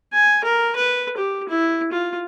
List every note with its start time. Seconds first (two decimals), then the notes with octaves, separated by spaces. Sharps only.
0.13 G#5
0.44 A#4
0.76 B4
1.17 G4
1.49 E4
1.92 F4